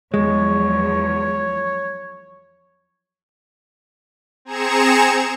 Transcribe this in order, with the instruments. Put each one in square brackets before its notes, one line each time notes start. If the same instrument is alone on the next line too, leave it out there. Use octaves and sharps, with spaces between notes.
[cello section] E2 F3 F#3 [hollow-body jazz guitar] G#3 [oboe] C#5
[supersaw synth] C4 G#4 A#5 G#6 C#7 E7